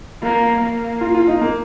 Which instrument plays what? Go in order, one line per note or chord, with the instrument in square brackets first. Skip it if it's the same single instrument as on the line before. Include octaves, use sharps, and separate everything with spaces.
[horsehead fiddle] A#3
A#3
[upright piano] F4
F4
D#4
A#3